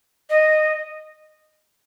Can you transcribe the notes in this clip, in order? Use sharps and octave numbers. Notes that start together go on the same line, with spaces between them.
D#5